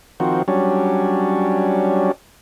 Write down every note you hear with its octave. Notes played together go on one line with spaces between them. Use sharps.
D#3 F3 C4 F#4
F#3 G3 C#4 D4